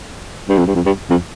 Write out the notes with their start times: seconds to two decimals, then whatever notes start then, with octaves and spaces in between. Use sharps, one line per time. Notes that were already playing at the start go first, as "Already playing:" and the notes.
0.49 G2
0.57 F2
0.67 G2
0.75 F2
0.86 G2
1.10 F2